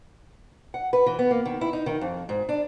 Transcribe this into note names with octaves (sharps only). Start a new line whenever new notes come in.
F#5
B4
E3
B3
A#3
D#3
E4
D#4
D#3
F2
G#2
D4